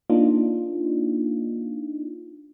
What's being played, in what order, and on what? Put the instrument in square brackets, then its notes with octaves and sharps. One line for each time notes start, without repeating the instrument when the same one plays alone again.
[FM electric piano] A#3 D4 D#4 F4